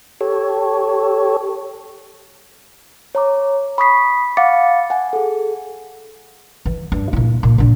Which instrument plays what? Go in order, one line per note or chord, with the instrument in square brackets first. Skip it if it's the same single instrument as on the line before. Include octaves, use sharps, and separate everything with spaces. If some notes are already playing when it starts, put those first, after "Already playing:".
[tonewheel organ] G4 A4 C#5
[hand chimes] C#5 A#5 D6
B5 C#6 D#6 B6 C7
F5 F#5 B5 D6 A6 C#7
F#5 G#5
G#4 A4
[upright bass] E3
G2
A#2 E4
A#2
A#2 D4